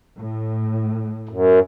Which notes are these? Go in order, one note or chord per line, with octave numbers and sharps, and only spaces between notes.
A2
F#2